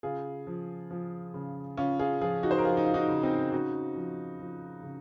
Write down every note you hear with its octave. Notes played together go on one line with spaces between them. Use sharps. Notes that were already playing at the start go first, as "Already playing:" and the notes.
C#3 F4 G#4
F3
F3
C#3
C#3 C#4 F4
F4 G#4
F3 F4 G#4
D#4 F#4
C5
A#4
F3 F4 G#4
D#4
F4
D#4 F#4
C#3
C4 D#4
C#3 D#4 F#4
F3
F3
C#3